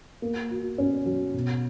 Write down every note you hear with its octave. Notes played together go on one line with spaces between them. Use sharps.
A#3
F#4
C#4
F#3
B2